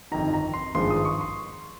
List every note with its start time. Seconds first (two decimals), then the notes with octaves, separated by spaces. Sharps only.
0.11 G1 F2 D#3 A#5
0.33 A#5
0.54 C6
0.74 G#1 G2 F3 G#3 C6
0.90 D#6
1.05 C#6
1.21 C6